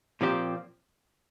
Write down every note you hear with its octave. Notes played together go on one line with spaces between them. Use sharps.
A#2 F3 C4 G4